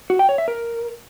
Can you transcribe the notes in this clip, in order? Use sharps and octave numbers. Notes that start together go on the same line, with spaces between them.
F#4
G5
C#5
E5
A#4